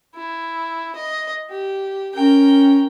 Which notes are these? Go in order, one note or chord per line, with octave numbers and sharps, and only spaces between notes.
E4
D#5
G4
C#4 A#4 G5